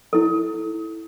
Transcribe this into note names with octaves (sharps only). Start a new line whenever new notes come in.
E4 A4